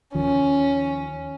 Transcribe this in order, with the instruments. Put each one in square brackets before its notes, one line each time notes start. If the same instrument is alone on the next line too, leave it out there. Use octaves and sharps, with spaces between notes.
[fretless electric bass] D#2 D#3 F3 [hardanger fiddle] C#4